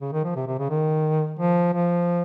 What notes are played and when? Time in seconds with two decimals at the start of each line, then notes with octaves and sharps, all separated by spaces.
0.01 C#3
0.13 D#3
0.24 F3
0.36 C3
0.47 C3
0.59 C#3
0.70 D#3
1.39 F3
1.74 F3